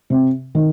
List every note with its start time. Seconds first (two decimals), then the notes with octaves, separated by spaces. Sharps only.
0.10 C3
0.55 D#3